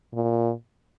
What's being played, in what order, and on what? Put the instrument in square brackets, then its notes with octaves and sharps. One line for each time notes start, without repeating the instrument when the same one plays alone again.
[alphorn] A#2